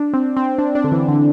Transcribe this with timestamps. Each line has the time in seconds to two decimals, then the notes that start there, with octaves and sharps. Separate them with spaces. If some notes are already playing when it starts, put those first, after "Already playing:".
Already playing: D4
0.14 C4
0.37 C4
0.58 D4
0.75 D4
0.84 D3
0.92 E3
1.08 D3